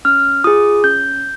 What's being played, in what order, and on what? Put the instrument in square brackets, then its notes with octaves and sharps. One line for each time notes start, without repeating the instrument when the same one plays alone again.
[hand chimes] C#4 F6
F4 G#4 D#6
C#4 G6